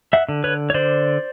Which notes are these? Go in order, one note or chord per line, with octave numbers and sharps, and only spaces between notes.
E5 F#5
D3
B4 C#5
C#5
D3 C5 D5